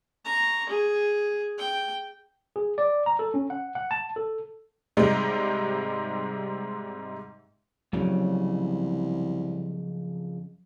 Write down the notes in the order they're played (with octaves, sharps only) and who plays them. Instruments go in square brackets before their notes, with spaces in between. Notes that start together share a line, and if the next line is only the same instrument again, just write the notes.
[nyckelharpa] A#5 C#6
G#4
G5
[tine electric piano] G#4
D5
A#5
A4
C#4
F#5
F#5
A5
A4
[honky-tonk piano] G#2 C3 G3 G#3 D#4
[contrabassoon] C2 [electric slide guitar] F2 C#3 [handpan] F#3